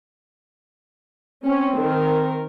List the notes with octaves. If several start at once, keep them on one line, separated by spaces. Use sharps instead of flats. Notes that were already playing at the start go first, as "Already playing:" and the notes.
C4 C#4
D#3 A#4